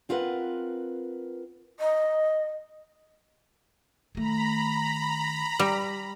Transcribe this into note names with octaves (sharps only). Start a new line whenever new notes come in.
C4 F4 A#4 B4 F#5
D#5
D#3 A3 A#5 B5
G3